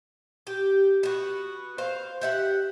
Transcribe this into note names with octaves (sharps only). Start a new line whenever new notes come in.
G4
B3 F#4
C5 F5
G4 E5 F#5